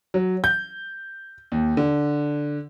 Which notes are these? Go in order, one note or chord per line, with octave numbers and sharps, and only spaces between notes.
F#3
G6
D#2
D3